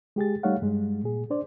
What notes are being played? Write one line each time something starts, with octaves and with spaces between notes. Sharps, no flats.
G#3 G4 G#4 A6
G3 A3 D#4 C#5 F5 F#5
G2 G3 G#3
A#2 G#4
D4 C5 D5